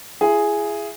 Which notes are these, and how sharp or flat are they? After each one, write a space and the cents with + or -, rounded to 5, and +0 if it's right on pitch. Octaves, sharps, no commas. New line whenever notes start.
E4 +45 G#4 +0